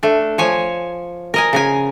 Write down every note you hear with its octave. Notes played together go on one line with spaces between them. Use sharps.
A3 D4
F3 C#5 G#5
A#4 D#5 G#5
C#3 A#4 G#5